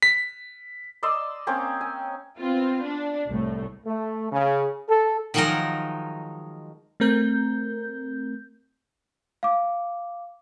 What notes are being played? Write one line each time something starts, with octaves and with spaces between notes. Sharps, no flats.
B6
D5 D#5 C6 E6
A#3 C4 C#4 C#5
G#5
B3 C4 F4
D4
C2 A2 A3
A3
C#3
A4
D#3 F3 F#3 G#3 D#4 A#4
A3 C4 A#4 G6
F5 D6